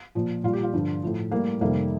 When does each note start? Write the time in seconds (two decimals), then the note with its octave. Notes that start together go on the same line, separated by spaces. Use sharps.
0.15 A#2 F3
0.44 A#2 G3 F4
0.53 G4
0.63 F4
0.73 G2 D3 F3
1.03 A2 F3
1.31 A2 G3 A#3
1.61 F2 C3 D#3 G3 A#3